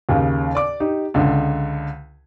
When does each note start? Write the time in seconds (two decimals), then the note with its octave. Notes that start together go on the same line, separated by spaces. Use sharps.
0.09 D#2 C#3
0.55 D5 D6
0.80 D#4 G4
1.14 C#2 D3